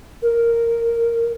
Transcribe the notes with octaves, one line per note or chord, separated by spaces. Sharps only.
A#4